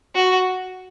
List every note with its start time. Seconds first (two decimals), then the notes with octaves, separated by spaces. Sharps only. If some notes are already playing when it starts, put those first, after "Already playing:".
0.15 F#4